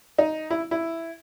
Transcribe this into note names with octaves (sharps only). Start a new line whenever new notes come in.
D#4
E4
E4